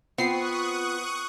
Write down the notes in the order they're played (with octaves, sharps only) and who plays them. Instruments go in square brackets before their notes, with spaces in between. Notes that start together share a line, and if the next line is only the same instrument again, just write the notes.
[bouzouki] B3 [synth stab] C4 C7 [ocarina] F4 [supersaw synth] C#6 D#6 F#6